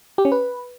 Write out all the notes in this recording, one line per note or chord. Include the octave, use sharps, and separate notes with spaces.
G4
C#4
B4